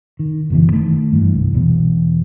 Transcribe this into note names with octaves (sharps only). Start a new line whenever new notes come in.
D#3
F#1 B2 E3
D#3 A3
G2 E3
C2
E1 E2 B2